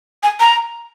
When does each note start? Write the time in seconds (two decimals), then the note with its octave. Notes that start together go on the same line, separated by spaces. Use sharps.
0.23 G#5
0.40 A#5